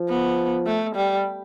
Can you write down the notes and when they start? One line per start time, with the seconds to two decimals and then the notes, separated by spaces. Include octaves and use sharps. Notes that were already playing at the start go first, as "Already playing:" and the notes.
Already playing: F3
0.08 B3
0.66 A3
0.95 G3